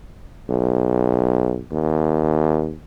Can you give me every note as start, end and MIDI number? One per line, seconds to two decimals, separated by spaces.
0.50 1.61 35
1.72 2.74 39